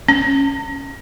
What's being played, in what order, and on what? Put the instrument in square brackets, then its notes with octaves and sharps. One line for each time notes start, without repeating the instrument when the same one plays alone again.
[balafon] C#4